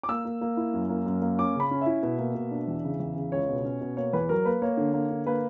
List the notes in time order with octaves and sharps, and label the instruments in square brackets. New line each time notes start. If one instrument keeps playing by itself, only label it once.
[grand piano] D6
A#3 E6
A#3
A#3
E4
F#2
A#3
F#2
A#3
C#4 D6
C#3 B5
C#4
E4 E5
B2
A#3
B2
D4
E2
C#3
E2
C#3
C#2 C#5
B2
C#4
B2
A#3 C#5
E2 B4
F#3 A#4
A#3 B4
A#3 C#5
D3
A#3
D3
A#3 B4